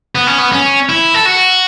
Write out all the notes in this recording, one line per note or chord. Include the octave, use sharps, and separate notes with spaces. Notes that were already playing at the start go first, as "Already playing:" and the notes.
B3
C#4
B3
C#4
E4
A4
F#4